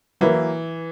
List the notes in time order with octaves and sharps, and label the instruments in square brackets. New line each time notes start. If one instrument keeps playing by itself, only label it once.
[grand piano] E3 [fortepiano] F#3 A#3 E4 B4